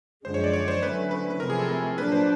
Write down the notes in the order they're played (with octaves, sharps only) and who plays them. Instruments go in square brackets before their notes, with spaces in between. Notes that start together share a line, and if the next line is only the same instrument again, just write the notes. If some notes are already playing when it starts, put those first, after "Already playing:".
[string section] F#2 D3 F3 G#3 [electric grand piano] C5
[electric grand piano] C#5
D5
C#5
C5
[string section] D3 F#3 A3 C#4 E4 [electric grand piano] B4
[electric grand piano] B4
B4
[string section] C3 F3 A3 C4 E4 [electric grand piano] A#4
[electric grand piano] G#4
A4
A#4
[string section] A#2 F#3 A#3 D4 [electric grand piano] B4
[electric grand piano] C5